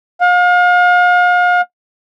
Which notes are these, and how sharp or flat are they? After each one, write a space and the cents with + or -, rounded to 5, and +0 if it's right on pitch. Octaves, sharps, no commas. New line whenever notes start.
F5 +40